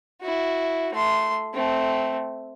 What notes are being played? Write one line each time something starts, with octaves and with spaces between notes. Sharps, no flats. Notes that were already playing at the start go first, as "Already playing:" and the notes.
E4 F#4
A3 C6
A3 C4